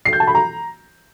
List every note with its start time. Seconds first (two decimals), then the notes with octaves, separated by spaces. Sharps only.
0.05 C7
0.13 G6
0.20 A5
0.27 B5
0.35 A#5